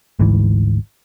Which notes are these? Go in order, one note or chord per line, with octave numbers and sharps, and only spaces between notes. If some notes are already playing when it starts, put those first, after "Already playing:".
G#1 D2 G#2 E3